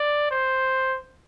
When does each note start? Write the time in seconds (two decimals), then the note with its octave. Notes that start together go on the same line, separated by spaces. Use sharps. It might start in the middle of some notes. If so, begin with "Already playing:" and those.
Already playing: D5
0.31 C5